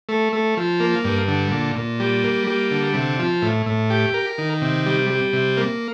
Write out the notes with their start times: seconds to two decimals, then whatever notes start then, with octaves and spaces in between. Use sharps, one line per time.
0.09 A3
0.33 A3
0.57 F3
0.80 A#3
1.04 G2
1.28 D3
1.51 A#2
1.76 A#2
2.00 G3
2.24 A#3
2.47 G3
2.71 D3
2.94 C3
3.19 F3
3.42 A2
3.66 A2
3.90 G4
4.14 A#4
4.38 D#3
4.62 C3
4.86 G3
5.10 G3
5.33 C3
5.57 A#3